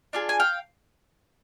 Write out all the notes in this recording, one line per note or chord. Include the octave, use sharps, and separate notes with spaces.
D4 F4 G#4
G#5
F5 G5